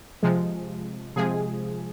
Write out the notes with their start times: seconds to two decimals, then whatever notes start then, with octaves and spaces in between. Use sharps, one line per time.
0.23 C3 F3 G#3
1.16 C3 F3 G#3 G#4